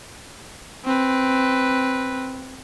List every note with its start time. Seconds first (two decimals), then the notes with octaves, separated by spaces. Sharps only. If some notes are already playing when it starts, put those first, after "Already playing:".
0.85 C4 B4